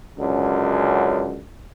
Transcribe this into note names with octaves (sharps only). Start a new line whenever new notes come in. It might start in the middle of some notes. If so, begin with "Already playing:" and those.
C#2 F#2 D3